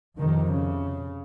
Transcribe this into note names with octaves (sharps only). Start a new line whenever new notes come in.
F2 C3 D#3
C#3